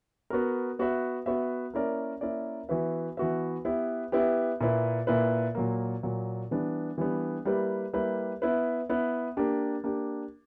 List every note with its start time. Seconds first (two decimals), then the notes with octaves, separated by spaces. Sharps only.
0.30 B3 F#4 A#4
0.79 B3 F#4 B4 E5
1.26 B3 F#4 B4 E5
1.74 A#3 C#4 E4 A#4 D5
2.21 A#3 C#4 E4 A#4 D5
2.69 E3 B3 F#4 B4 E5
3.17 E3 B3 F#4 B4 E5
3.65 B3 E4 G4 B4
4.12 B3 E4 G4 B4
4.61 A#2 A#3 E4 B4
5.07 A#2 A#3 E4 B4
5.55 A#2 F#3 A#3
6.03 A#2 F#3 A#3
6.51 E3 G3 B3 D4
6.98 E3 G3 B3 D4
7.45 G3 A#3 E4 G4 B4
7.93 G3 A#3 E4 G4 B4
8.42 B3 E4 B4
8.89 B3 E4 B4
9.37 A#3 D4 G4
9.84 A#3 D4 G4